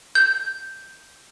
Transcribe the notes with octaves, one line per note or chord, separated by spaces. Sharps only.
G6